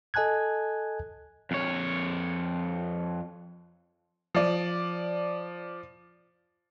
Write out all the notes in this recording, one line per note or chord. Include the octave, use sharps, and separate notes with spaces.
A4 D#5 G#5 A5 F#6 G#6
F2 C#5
F3 D5